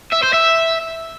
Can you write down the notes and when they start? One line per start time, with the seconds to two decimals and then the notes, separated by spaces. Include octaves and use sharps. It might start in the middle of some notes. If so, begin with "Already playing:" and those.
0.13 E5
0.23 C5
0.34 E5